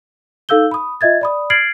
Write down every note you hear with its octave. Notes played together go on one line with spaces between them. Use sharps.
D#4 A4 F5 E6 G6 G7
B5 D#6
F4 D#5 E5 G#6 A6
D5 B5 D#6
F6 G#6 A6 C7 D7 F#7